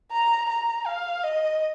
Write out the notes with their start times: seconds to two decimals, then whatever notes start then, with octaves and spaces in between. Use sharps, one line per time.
0.12 A#5
0.50 A#5
0.86 F5
1.24 D#5